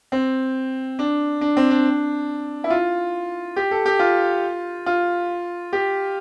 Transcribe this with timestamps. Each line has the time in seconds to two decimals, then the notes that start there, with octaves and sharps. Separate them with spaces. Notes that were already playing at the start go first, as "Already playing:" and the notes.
0.12 C4
0.99 D4
1.41 D4
1.57 C4
1.70 D4
2.64 E4
2.70 F4
3.56 G4
3.71 A4
3.86 G4
3.99 F4
4.86 F4
5.73 G4